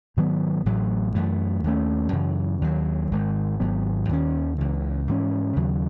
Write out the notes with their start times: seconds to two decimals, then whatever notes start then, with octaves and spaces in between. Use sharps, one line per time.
0.17 G#2 D#3 F#3 B3
0.66 A1 A2 F#3
1.14 F#2 E3 A3
1.64 D#2 D#3 A3 C#4
2.13 F#2 C#3 E3
2.61 D#2 D#3 F#3
3.11 G#1 G#2 D#3 G#3
3.60 G#1 G#2 F#3 B3
4.09 D#2 D#3 A3 C#4
4.58 C#2 C#3 E3
5.08 G#2 E3 A3 C#4
5.56 D#2 C#3 F#3